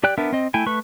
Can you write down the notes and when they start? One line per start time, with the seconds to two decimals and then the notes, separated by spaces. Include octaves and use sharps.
0.04 G4 D5 G5 F#6
0.18 B3 D4 A#4 E5
0.33 C4 D#5
0.54 A3 E4 G5 G#5
0.66 A3 B4 C#6